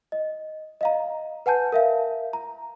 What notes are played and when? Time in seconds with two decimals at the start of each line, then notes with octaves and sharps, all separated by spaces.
0.12 D#5
0.81 D#5 F5 A#5
1.46 B4 F#5 G#5 A5 G6
1.72 A#4 E5 F5
2.33 A#5